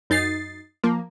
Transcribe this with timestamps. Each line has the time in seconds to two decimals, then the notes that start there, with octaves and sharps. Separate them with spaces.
0.10 F#2 D#4 A6 C7
0.84 F3 A#3